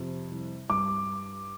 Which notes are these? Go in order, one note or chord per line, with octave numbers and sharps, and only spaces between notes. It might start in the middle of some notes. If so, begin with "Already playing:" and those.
Already playing: F2 C3
C2
G2 D6